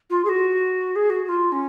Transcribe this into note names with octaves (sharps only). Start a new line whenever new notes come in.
F4
G#4
F#4
G#4
F#4
F#4
F4
C#4